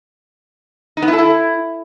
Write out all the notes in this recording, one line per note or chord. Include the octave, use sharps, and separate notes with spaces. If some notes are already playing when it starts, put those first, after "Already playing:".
D#4
B3
E4
A4
E4